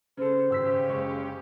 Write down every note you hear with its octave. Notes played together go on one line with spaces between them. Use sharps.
C#3 A4 C5
G#1 C#3 C#4 G4 E6 B6
F#1 G#3 C#6